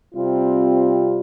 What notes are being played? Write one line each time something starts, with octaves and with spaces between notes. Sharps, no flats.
C3 G3 C4 F4